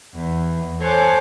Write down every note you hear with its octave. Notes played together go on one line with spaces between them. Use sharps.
E2
A4 C5 C#5 G#5 D6 F#6